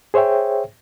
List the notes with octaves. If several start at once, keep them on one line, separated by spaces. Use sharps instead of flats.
G#4 C5 C#5 E5 G5